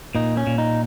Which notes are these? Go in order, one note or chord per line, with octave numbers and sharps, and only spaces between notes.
A#2 D#4
C#4
A#2
D#4